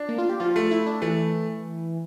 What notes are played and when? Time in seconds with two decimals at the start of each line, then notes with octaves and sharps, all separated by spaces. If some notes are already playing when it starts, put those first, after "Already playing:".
Already playing: D4
0.09 A#3
0.18 F4
0.29 G4
0.40 F3 F4
0.56 A3
0.71 E4
0.87 D4
1.02 E3 A3